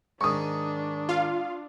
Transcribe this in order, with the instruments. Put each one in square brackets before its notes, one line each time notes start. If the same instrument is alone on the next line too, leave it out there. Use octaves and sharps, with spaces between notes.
[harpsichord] G#2 D#3 [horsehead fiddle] D4 [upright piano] C#6 D#6
[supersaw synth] F4 F5